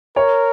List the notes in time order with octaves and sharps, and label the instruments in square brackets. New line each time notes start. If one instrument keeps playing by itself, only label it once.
[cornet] A#4 [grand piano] C#5